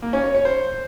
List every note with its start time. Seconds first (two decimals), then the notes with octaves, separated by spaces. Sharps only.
0.02 A#3
0.13 C#4
0.24 C#5
0.34 C#5
0.45 C5